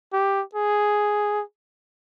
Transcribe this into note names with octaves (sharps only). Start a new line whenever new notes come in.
G4
G#4